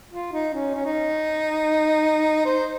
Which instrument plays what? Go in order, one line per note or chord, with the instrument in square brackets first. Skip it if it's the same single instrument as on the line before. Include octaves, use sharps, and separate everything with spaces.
[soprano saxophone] F4
D#4
C#4
C#4
D#4
C5